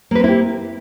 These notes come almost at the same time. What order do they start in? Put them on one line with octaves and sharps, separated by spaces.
A#3 B4 C4 E4 G4